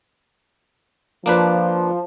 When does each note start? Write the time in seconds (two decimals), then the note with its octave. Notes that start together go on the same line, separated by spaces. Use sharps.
1.26 F3 A#3 D4 B4